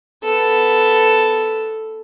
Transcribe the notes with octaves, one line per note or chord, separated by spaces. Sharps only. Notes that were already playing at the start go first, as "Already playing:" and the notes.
B3 A4